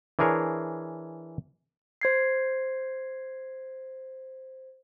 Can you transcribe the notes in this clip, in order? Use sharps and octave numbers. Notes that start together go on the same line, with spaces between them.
E3 D4 G#4 A#4 C#5
C5 G#6 C7